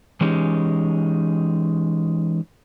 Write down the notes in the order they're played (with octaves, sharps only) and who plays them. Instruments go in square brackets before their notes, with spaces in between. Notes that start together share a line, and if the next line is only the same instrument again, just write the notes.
[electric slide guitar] E3 G#3 C#4 D#4 G4